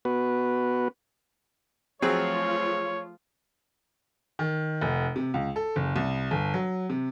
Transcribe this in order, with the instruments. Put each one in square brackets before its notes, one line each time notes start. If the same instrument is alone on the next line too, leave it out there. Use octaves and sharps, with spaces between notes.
[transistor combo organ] B3 F#4 B4
[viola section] F3 A3 F4 [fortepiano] F#3 C4 G#4 [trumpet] C#5
[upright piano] D#3
F1
C3
C#2
A4
F#1
C2
G1
F#3
C3